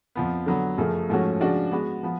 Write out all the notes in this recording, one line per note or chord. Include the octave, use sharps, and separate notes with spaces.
F2 F3 B3
D3 F#3 B3
F#2 C#3 F3 A3
G#2 F3 A3 C#4 F#4
C#3 F3 G#3 D4 F#4
G#3 B3 F#4
F3 B3